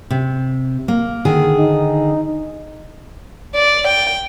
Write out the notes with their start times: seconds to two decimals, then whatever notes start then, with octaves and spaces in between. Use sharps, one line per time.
0.10 C3
0.88 A#3
1.25 D3 D#3 G#4
1.59 D#4
3.55 D5
3.88 G5